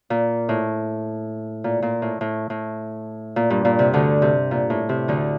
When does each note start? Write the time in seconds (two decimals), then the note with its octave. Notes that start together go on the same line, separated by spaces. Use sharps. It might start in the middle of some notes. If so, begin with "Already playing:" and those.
0.10 A#2
0.49 A2
1.64 A#2
1.82 A#2
2.02 A2
2.21 A2
2.50 A2
3.36 A#2
3.50 G2
3.65 A#2
3.79 C3
3.94 D2 D3
4.22 C3
4.51 A#2
4.70 A2
4.89 C3
5.08 D2 D3